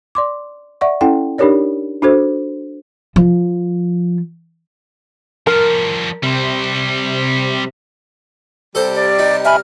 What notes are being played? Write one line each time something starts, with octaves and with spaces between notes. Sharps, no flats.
D5 C6 D6
D5 E5 F#5 C#6
C#4 E4 A4 F#5 G5
D4 D#4 G4 A#4 C#5 D5
D4 F#4 A4 C5
F3
F3 G3 A#4
C3 G3 C5
C3 G3 A4 C5
D5
D#4
E5 G#5 B5 F6